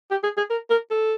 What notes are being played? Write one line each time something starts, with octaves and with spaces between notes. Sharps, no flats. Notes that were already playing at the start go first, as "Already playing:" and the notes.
G4
G#4
G#4
A#4
A#4
A4